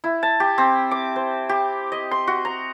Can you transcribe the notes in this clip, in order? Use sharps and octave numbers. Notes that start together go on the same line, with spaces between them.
E4
A5
G4
C4
D6
C5
G4
D#5
C6
F#4
A#5